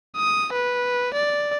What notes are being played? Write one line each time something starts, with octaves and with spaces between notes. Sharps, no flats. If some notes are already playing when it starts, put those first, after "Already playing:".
D#6
B4
D5